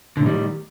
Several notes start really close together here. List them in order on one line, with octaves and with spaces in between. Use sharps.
D3 A2 D#3 G3